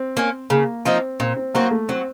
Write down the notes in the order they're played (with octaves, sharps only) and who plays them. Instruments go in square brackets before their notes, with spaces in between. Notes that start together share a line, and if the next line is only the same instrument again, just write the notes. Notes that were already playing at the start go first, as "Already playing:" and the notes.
Already playing: [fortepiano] C4
[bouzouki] A#3 C#4
[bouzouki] C#3 [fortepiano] A#3
[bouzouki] F3 A#3 D#4 [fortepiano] C4
[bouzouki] A#2 [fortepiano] C4
[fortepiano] C4
[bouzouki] F#3 C4 F#4 [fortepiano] A#3
[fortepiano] A3
[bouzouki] F#3 [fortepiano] C4